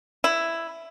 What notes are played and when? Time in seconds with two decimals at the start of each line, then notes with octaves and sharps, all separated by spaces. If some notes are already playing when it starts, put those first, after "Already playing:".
0.24 E4